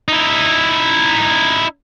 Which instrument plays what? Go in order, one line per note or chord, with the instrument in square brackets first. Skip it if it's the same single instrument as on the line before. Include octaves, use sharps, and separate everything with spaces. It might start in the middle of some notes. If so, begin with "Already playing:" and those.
[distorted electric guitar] D#4 E4